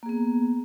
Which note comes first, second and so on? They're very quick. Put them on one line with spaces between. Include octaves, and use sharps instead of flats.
A#3 G#4 B3